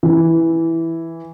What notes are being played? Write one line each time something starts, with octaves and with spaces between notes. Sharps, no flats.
E3